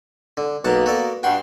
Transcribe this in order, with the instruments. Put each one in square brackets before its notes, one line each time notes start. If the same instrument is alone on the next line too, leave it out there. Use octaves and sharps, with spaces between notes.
[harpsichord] D3
[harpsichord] B1 F#5 A5 [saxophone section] A#3 B3
[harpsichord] F#4 A4 D5
[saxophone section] G2 F#4 [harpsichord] G5 C6